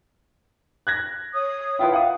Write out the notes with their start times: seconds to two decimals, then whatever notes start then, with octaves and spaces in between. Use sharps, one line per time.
0.87 F#6 G#6 A#6
1.34 C#5 D#6
1.79 E4 F4 B4 G5
1.93 F5 F#5 D#6